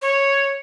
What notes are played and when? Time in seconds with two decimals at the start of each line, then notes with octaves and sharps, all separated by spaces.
0.02 C#5